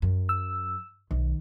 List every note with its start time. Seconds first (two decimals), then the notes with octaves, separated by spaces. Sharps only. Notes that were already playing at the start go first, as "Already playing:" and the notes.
0.02 F#2
0.29 E6
1.11 B1 D#3